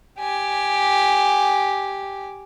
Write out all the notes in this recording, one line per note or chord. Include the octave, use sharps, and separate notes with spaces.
G4 G#5